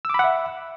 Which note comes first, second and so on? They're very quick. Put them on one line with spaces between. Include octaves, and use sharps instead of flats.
E6 D6 B5 F#5 E5